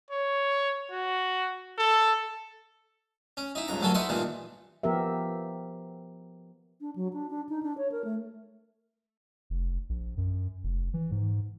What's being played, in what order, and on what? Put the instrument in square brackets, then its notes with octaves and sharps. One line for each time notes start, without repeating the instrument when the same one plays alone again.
[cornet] C#5
F#4
A4
[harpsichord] C#4
D#4 E4
C#2 G2 A#5
D2 G2 F#3 A#3 A4 G#5
D#4 E4 B4 F#5 C6
G2 A#2 D#3 E3
[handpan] F3 B3 G4 A#4 E5
[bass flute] D4
F#3
D4
D4
D#4
D4
C#5
A#4
A3
[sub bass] F1
A#1
F#2
F1
E3
G#2